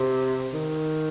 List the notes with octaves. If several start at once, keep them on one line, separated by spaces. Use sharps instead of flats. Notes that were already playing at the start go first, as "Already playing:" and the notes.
Already playing: C3
D#3